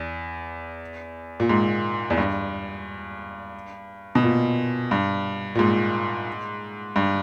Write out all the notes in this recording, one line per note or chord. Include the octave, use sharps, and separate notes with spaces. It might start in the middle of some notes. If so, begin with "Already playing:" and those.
Already playing: E2
A#2
G#2
E2
G2
B2
A#2
G2
A#2
G#2
G2